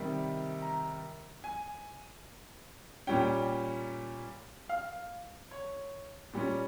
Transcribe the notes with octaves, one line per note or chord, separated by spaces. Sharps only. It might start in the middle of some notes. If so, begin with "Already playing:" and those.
Already playing: C3 D#3 G3
A#5
G#5
A#2 G3 C#4 G5
F5
C#5
A#2 G3 C#4